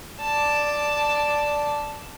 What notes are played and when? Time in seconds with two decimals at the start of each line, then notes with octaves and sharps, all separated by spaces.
0.21 D5 A5